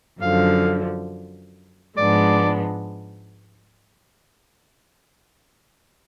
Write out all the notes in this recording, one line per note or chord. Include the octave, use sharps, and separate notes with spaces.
F#2 D3 F3 F5
G#2 F3 G#3 B3 D4 D5